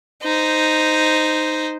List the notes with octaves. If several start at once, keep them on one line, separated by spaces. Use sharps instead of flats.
D#4 C5